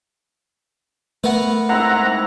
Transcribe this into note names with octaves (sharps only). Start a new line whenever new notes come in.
A3 B3 A#4 B4
G#2 C4 E4 F#5 A#5